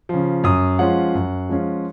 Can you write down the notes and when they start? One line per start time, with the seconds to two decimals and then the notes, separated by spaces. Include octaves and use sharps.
0.09 C#3 F3
0.44 F#2 D#6
0.79 F3 G#3 C#4 F4 F#5
1.14 F#2
1.49 F3 G#3 C#4 F4